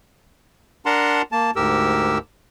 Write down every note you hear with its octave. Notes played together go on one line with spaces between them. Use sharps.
D4 A#4 F#5 A5 A#5 C6
A#3 A5
D2 G#2 G4 A#4 E6